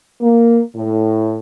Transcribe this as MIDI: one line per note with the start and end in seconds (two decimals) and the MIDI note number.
0.21 0.60 58
0.76 1.38 45